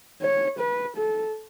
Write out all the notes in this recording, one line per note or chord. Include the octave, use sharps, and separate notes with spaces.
C#5
B4
A4